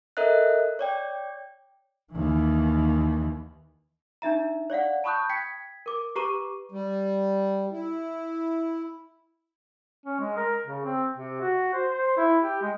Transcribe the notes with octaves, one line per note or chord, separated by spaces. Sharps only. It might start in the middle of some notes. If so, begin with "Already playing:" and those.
A4 A#4 D#5 E5 F#6
C#5 D5 G5
D#2 E3
D4 D#4 E5 A#5
C#5 D5 F5 F#5
A5 B5 C#6 D#6 F#6 G6
G5 G#6 B6 C#7
A#4 D6
G4 B4 A#5 C#6 D6 D#7
G3
E4
C#4
G#3
A#4
C#3
C4
C3
F#4
C5
C5
E4
G4
G#3